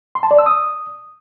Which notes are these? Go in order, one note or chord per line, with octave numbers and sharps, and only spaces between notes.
C6
A5
D5
E6
D#6